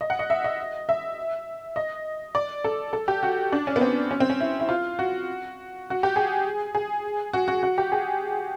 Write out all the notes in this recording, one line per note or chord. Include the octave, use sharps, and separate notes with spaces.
D#5
F#5
D#5
E5
D#5
E5
D#5
D5
A4
A4
G4
F#4
D4
C#4
B3
C4
C#4
C4
C#4
E4
E4
F4
F#4
F#4
G4
G#4
G#4
F#4
F#4
F#4
G4
G#4